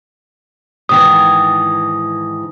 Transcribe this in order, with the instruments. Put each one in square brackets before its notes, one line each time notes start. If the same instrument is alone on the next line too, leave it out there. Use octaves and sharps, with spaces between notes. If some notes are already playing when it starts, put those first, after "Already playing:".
[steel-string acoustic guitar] G#2 D#3 E3 [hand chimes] D#6